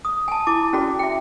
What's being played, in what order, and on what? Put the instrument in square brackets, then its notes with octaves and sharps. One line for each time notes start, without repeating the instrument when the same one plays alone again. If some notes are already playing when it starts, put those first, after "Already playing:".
[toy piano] D#6
G#5 A5
E4 A5 D6
C#4 F#4 G#4 D5
E5 G5